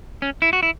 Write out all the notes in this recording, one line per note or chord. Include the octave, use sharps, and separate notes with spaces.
C#4
E4
F#4
E4